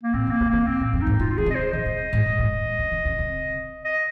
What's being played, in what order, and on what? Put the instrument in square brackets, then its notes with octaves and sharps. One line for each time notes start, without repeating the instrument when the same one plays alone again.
[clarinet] A#3
[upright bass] A#2 [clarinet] C4
[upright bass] C3
[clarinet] A#3
[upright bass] C3
[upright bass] D#3 [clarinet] A#3
[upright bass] C3 [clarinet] C4
[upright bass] A#2
[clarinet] C4
[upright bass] F2
[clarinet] D#4
[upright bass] G#2
[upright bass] C3 [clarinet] F4
[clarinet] F4
[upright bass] D#3 [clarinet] G#4
[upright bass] C3
[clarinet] D#5
C5
[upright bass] D#3 [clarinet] D#5
[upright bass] C3
G#2
A#2
G#2
A#2
C3
D#3
C3
C3
[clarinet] D#5